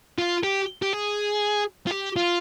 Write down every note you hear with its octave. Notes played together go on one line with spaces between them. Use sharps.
F4
G4
G4
G#4
F4
G4
F4